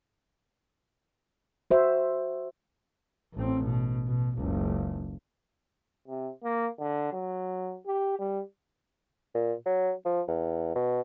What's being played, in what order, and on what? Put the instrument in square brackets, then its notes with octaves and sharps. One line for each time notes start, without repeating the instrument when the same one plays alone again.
[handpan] F#4 C5 E5
[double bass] A1 C4
B2
B2
F#1 C#2
[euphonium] C3
A#3
D3
F#3
G4
G3
[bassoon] A#2
F#3
F3
E2
B2